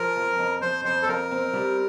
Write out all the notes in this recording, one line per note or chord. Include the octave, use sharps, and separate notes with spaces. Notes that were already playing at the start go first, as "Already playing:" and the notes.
Already playing: F3 A#4
F2
F2
F2 C5
F2 C5
A4
F2 A#4
C4
G3